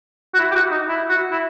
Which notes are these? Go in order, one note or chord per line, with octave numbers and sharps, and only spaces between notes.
F#4
E4
G4
F#4
D#4
E4
F#4
E4